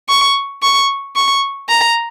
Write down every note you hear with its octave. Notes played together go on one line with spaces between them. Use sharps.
C#6
C#6
C#6
A#5